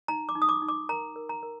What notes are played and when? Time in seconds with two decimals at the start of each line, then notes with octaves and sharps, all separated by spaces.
0.08 D#4 A#5
0.29 D6
0.35 D#4
0.42 D#6
0.49 D6
0.62 D#4
0.68 D6
0.89 A#4 A#5
1.16 A#4
1.29 A#5
1.43 A#4